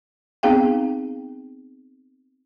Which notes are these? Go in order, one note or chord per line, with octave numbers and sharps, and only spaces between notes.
B3 C4 D#4 G#4 F5 G5